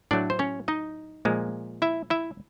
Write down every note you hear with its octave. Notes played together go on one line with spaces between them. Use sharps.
A2 F#3 A3 D4 D5
C5
C#4 C#5
D#4 D#5
A#2 F3 G#3
E4 E5
E4 E5